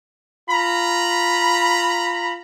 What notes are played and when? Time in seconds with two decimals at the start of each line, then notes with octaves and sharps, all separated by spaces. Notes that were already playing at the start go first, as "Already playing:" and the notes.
0.49 F4 A#5 B5